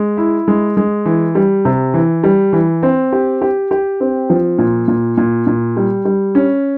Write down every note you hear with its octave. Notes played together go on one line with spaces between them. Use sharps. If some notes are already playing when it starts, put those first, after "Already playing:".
Already playing: G#3
E4
G#3
G#3
E3
G3
C3
E3
G3
E3
C4
G4
G4
G4
C4
F3
A#2
A#2
A#2
A#2
G3
G3
C#4